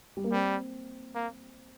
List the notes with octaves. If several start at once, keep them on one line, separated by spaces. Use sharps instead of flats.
G3
A#3
G3 C4
A#3